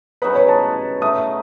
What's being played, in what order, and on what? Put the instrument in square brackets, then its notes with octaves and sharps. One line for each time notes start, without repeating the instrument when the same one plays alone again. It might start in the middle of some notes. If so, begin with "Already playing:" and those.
[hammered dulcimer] C#3 F#3 B3 D#4 [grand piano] B4
[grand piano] C#5
A5
[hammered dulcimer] F#3 A3 D#4 [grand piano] D#6